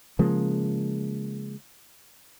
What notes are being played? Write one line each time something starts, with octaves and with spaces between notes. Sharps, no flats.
C#3 F3 G#3 A#3